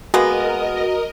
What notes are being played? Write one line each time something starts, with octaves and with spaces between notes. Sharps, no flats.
G#3 A#3 B3 F#4 A#4 D#5